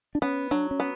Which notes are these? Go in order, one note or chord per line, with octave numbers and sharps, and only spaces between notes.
D4
B3 C#4
F#3 D4
C#4
B3